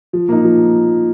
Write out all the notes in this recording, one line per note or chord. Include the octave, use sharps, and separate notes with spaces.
F3
A#3 D#4
F3